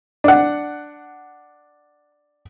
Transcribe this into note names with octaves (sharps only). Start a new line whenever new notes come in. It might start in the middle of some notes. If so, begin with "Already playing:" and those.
D4 F#5